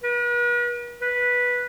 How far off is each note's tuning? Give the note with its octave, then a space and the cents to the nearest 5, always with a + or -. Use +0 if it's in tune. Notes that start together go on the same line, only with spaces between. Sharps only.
B4 -45
B4 -10